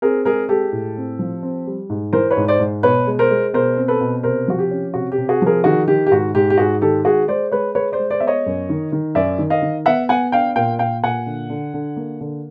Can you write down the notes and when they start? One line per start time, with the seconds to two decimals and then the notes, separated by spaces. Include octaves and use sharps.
0.02 C4 G#4 A#4
0.25 G#3 G#4 A#4
0.49 G#3 G4 A4
0.72 A2
0.97 C4
1.19 F3
1.43 C4
1.67 G3
1.90 G#2
2.13 E3 A#4 C5
2.30 B4 C#5
2.37 G#2
2.48 C5 D5
2.60 G#2
2.83 B2 B4 C#5
3.07 G#3
3.19 A#4 C5
3.30 G#3
3.53 B2 A#4 C5
3.77 C4
3.88 A4 B4
4.01 B2
4.23 C3 A#4 C5
4.48 F3 F#4
4.59 G4
4.71 C#4
4.94 C3 F#4
5.12 G4
5.18 C3
5.29 F#4 G#4
5.42 F3 G#4 A#4
5.64 D#3 F#4 G#4
5.87 D#3 G4
6.07 G4
6.11 G#2 F#4
6.35 G#2 G4
6.50 G4
6.58 G#2 F#4 G#4
6.81 D#3 G4 A4
7.05 G#3 F#4 G#4
7.28 G#3 C5 D5
7.52 G#3 B4 C#5
7.75 G#3 B4 C#5
7.92 C5 D5
7.99 G#3
8.10 C5 D5
8.20 B3 E5
8.27 C#5 D#5
8.46 F#2
8.69 D#3
8.92 D#3
9.15 F#2 D5 E5
9.38 D#3
9.50 D#5 F5
9.62 D#3
9.86 B3 E5 F#5
10.09 B3 F#5 G#5
10.32 D4 F5 G5
10.56 A#2 F5 G5
10.79 A#2 F5 G5
11.04 A#2 F#5 G#5
11.26 D3
11.50 D3
11.74 D3
11.96 A#3
12.21 D3